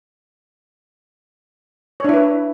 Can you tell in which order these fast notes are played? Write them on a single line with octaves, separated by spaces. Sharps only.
C#5 D4 E4 B4